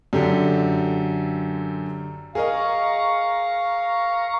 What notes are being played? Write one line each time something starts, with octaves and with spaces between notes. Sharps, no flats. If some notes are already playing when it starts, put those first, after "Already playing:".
F#2 D3 G4 A4
G#4 A#4 D#5 F5 A#5 C#6